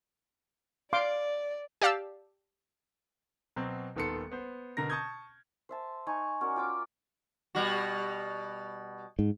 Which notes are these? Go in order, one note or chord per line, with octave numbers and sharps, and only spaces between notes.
D5 F5 C6 D6
G4 D5 F5 A5 E6
B2 F#3 C4
D#1 D#3 B3 A4 C6 C#7
B3 C5
B2 D3 A#4 A#6
A5 C#6 D#6 G6 G#6
C5 E5 A5
D#4 G#5 C#6
C#4 F#4 A#4 D5
F4 G5 D6
B2 G3 F#4
G#2